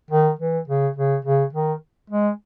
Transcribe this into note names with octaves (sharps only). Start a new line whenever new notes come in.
D#3
E3
C#3
C#3
C#3
D#3
G#3